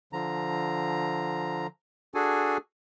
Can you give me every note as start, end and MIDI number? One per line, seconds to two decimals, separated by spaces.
0.13 1.67 50
0.13 1.67 53
0.13 1.67 82
2.15 2.57 62
2.15 2.57 66
2.15 2.57 68
2.15 2.57 69
2.15 2.57 80